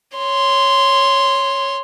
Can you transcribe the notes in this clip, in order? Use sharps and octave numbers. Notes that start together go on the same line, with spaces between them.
C#5 C6